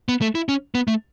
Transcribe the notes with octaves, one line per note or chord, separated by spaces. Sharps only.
B3
A3
E4
C#4
B3
A3